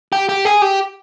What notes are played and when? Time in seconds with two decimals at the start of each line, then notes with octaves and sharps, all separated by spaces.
0.13 G4
0.29 G4
0.45 G#4
0.62 G4